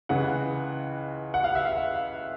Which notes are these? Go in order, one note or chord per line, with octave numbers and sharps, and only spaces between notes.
C#2 C#3 E3 F#5
F#5
F5
E5
F5